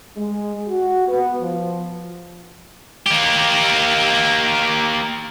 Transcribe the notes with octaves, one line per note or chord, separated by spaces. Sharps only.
G#3
F#4
B3
F3
A#3 G4